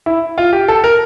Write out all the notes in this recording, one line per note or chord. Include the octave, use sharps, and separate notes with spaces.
E4
F4
G4
A4
A#4